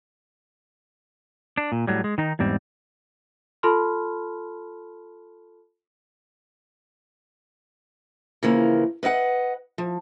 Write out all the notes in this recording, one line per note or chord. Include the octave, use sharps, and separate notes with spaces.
D4
A#2
A2 F#3 G3
G#3
D#3 D#4
E2 G#2 G3 C4
F4 A4 A5 B5 C6 F6
C#3 E3 F3 A#3
B4 D#5 F5 F#5
F3